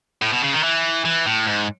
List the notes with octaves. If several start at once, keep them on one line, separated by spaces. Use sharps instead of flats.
A2
B2
C#3
D#3
E3
E3
A2
G#2